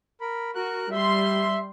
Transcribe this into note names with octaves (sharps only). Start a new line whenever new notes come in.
A#4 B5
F#4 A#4 F#6
G3 E5 C6